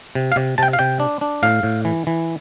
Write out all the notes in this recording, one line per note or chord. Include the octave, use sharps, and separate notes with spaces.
C3
F5
C3
C3 G5 A5
F5
C3 G5
D4
D4
A2 F5
A2
E3
E3